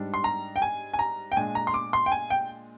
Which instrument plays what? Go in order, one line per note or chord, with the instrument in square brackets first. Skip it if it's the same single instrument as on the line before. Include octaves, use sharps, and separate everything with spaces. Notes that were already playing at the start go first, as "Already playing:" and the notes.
Already playing: [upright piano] G#2 G3 D4
C6
A#5
G5
G#5
G#5
A#5
G5
A#2 G#3 D4 G#5
A#5
C6
D6
C6
G5
G#5
G5